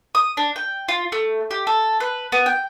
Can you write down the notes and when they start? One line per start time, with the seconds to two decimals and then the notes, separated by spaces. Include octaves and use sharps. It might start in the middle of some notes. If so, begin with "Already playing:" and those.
0.15 D#6
0.37 D4
0.56 G5
0.89 F4
1.12 A3
1.51 G4
1.67 A4
2.00 B4
2.32 B3
2.46 G5